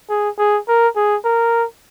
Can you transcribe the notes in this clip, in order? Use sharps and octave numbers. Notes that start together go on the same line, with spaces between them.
G#4
G#4
A#4
G#4
A#4